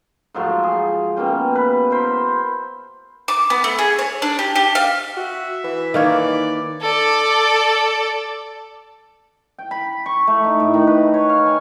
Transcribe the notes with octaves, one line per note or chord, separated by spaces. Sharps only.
G#2 F3 F#3 A3
G#4
B2 A#3 C#4 G5
B4
E4 A#4 C5 B5
D6
B3
A3
G#4
C#5
D4
G4
G4
F5
F#4 E5
E3
D#3 A#3 C#5 D5
A4 D5
G5
B5
C#6
A3
D#4
A2
D#3
B4
C#5
F5
G#5